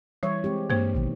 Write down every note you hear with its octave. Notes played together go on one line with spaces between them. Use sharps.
E3 G3 C#5
G#3 C4 G4
G2 A#3 C5
A1 B2 D#3